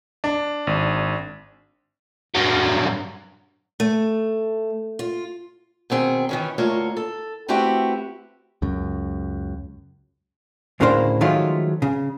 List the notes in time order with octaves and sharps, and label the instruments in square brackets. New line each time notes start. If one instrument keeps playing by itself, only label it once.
[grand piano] D4
[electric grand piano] G#1
[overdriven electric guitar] G2 F#3
[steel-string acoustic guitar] A3
F4
B2 D#3 C4 G#4
D#3 E3 C#4
D2 A3 A#3 F4 C#5
A4
A3 C4 E4 F#4 G4 B4
[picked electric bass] C#2 F#2
[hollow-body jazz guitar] D2 A2 C#3 A#3 D4 C5
D#3 F3 F#3 G#3 A3 F4
C#3